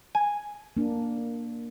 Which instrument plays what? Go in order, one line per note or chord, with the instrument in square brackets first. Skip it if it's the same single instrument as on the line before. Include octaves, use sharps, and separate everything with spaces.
[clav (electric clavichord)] G#5
[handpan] A#3 D4